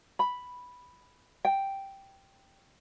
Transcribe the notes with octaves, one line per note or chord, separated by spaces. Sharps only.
B5
G5